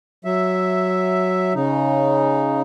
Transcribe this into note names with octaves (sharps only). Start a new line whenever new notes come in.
F#3 E5
C#3 D#4